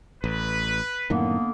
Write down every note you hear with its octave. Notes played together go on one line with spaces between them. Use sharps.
A1 B4
F#2 A2 D3 D#3 A#3 B3